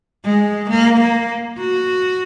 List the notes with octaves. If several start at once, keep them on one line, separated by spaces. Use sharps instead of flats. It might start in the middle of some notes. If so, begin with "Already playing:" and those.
G#3
A#3
A#3
F#4